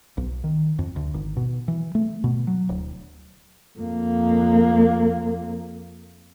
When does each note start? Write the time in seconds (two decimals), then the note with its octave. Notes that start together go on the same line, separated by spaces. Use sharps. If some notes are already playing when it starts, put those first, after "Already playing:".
0.17 B1
0.44 D#3
0.79 F2
0.96 D2
1.14 G#1
1.37 B2
1.68 E3
1.95 A3
2.24 B2
2.47 F#3
2.69 D1
3.79 F2 A#3